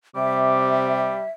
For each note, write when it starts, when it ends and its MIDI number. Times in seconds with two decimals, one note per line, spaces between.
0.16 1.17 48
0.16 1.25 55
0.16 1.30 76
0.16 1.18 86